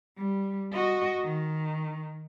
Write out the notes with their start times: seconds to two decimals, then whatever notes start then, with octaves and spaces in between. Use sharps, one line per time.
0.18 G3
0.73 F#4 D#5
1.24 D#3